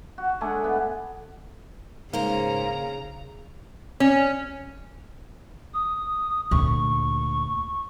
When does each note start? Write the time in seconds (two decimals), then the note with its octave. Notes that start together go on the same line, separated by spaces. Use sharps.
0.18 F#4
0.41 G#3 A3 D4 G#4
0.64 B3
2.13 G#2 C#3 A#3 C5 A#5
4.00 C#4
5.74 D#6
6.51 D2 A#2 C#6